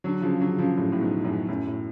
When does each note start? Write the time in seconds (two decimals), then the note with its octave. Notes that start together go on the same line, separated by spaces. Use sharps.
0.04 D3 F#3
0.22 C#3 F3
0.40 D3 F#3
0.58 C#3 F3
0.77 A2 C#3
0.92 A2
1.01 G#2 B2
1.24 F#2 A2
1.48 F#2 A2
1.67 A2